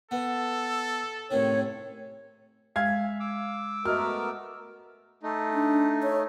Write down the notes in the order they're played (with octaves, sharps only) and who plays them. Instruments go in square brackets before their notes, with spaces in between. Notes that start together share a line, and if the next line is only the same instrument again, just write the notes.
[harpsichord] B3 [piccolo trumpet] A4
[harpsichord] A1 C3 D#3 [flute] C#5
[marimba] G#3 [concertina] E5 [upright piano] F5 G#6
[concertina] D6 E6
[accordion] A3 B3 A#4 [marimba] F#4 D#5 [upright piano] F6
[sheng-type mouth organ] A3 D#4
[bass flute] D4
C#5